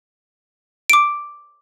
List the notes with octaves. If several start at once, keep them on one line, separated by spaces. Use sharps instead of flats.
D6 D7